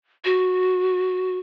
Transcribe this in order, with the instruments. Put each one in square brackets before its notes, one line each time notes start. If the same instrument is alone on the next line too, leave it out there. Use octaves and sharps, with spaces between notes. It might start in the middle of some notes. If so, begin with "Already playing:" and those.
[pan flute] F#4